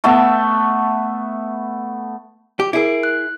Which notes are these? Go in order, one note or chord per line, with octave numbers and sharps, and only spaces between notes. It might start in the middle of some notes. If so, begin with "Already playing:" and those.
A3 B3 E5 A5
G4
E4 G#4 A#4 C7 D7
F#6